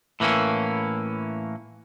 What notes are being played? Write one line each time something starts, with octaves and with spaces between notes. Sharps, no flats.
A2 E3 A#3 C#4